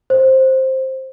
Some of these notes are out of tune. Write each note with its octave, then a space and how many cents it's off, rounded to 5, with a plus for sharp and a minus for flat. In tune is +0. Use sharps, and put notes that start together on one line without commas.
C5 +10